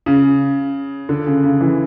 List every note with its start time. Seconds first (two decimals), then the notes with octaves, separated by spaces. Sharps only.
0.06 C#3
1.09 D3
1.27 C#3
1.44 C#3
1.61 E3